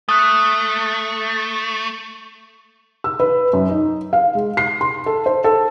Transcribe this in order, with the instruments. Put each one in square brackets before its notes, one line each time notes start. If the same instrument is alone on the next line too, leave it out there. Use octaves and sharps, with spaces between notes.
[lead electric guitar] A3 [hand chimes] D#6 F#6
[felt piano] E6
B4
F#2
D#4
F5
G#3
C7
C6
A4
C5
A4